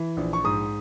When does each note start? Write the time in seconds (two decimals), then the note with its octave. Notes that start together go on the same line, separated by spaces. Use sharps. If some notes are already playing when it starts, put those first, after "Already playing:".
Already playing: E3
0.17 A#1
0.33 C#6
0.44 G#2 D#6